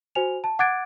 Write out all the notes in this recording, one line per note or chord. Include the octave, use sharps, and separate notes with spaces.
F#4 C5 G#5 F7
A5
F#5 D6 F#6 G#6 A6 D7